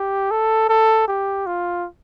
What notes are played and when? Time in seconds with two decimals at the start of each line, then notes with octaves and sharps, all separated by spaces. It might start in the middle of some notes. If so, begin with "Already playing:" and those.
Already playing: G4
0.31 A4
0.69 A4
1.08 G4
1.46 F4